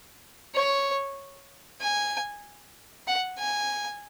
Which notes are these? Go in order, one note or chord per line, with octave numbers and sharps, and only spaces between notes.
C#5
G#5
F#5
G#5